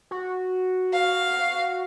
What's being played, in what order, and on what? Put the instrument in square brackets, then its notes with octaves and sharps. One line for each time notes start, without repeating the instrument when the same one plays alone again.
[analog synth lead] F#4
[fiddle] F5